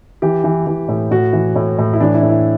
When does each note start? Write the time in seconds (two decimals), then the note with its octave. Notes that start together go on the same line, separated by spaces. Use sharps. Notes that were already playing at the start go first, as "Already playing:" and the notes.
0.22 E3 G4
0.44 E3
0.66 E3
0.88 A2
1.11 A2 F#4
1.33 E3
1.56 A2
1.78 A2
1.93 E4
2.01 E3 D4
2.14 E4
2.22 A2
2.29 E4